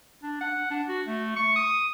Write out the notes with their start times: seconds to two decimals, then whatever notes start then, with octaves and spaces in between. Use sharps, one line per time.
0.23 D4
0.41 F#5
0.71 D4
0.88 F#4
1.07 A3
1.36 C#6
1.56 D#6